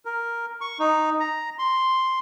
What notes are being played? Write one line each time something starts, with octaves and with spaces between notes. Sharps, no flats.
A#4
C#6
D#4
A#5
C6